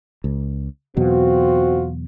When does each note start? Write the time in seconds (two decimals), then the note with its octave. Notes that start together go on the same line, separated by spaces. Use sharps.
0.24 C#2
0.97 E2 B2 F#3 C4 F4 F#4